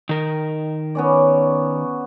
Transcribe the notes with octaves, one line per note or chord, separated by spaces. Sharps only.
D#3 A#4
B3 C#4 D5